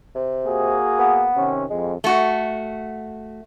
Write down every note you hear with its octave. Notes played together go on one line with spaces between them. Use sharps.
C3
A#3 F#4 G#4
B3
C3 D#3 C#4
F2 G#3
A3 F#4